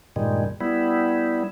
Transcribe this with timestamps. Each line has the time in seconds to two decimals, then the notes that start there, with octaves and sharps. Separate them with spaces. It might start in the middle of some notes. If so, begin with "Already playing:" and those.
0.16 G2 A#2 D#3 G3 G#3
0.60 G3 B3 E4